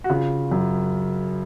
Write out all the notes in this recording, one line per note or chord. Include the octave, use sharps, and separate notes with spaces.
F#4
C#3 F4
F#2